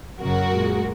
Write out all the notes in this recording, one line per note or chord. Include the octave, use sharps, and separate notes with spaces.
F#2 C#3 F#3 F#4 A#4
A#2 G#3